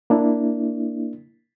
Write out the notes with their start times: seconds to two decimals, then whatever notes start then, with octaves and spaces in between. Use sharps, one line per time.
0.10 A#3 D4 E4